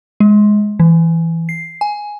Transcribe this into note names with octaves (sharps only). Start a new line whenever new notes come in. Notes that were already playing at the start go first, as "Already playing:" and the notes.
G#3
E3
C7
G#5